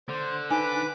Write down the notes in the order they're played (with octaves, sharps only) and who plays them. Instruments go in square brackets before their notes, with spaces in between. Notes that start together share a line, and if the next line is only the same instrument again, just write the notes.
[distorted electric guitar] D3 [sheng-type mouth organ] C5
[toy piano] D#4 [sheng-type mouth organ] B4 D6 [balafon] G#5